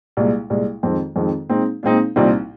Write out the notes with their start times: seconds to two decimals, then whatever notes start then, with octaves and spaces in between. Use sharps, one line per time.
0.17 C2 A#2 G#3
0.50 C2 A#2 G#3
0.83 F2 D#3 G#3 C4
1.16 F2 D#3 G#3 C4
1.50 A#2 G#3 C4 D#4
1.83 A#2 G#3 C4 D#4
2.16 C2 A#2 F3 C4 D#4